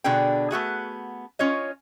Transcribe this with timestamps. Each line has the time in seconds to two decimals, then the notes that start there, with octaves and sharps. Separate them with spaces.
0.04 B2 D3 D4 G#4 G5
0.51 A3 B3 F#4 G#4
1.39 C#4 F4 C#5 D#5